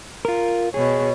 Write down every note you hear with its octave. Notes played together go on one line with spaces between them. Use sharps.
F4 A#4
B2 G#4 C#5